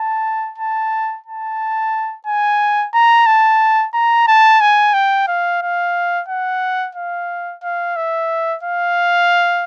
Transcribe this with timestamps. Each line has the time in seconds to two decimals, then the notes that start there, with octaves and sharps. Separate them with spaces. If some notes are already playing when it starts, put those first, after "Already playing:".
Already playing: A5
0.58 A5
1.26 A5
2.27 G#5
2.94 A#5
3.27 A5
3.94 A#5
4.28 A5
4.61 G#5
4.94 G5
5.28 F5
5.62 F5
6.28 F#5
6.95 F5
7.63 F5
7.97 E5
8.63 F5